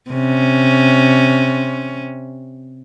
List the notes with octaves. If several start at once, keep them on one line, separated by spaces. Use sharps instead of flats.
C3 C#4